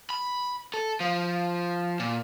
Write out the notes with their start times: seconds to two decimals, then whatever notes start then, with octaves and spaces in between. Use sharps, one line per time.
0.10 B5
0.74 A4
1.00 F3
1.99 A#2